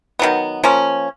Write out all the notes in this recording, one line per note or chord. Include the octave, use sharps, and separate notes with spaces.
D#3 F#3 B3
F3 A#3 C#4